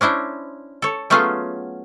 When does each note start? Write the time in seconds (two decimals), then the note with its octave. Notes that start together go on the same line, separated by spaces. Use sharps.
0.01 C#4 D4 E4 C5
0.82 A4 C#5
1.10 F#3 A3 B3 C#4 F4 G#4